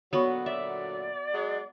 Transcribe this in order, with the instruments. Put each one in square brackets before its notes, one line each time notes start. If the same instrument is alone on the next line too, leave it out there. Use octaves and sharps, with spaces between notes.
[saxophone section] A#2 D3 F#3 [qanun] B3 F#4 [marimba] C#5 B5 C#6
[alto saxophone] D5 [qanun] E5
[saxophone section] F#3 G#3